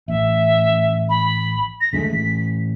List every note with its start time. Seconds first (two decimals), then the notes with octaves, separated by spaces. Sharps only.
0.08 A1 E5
1.09 B5
1.81 A#6
1.93 D3 G#3 A3 B6
2.10 A1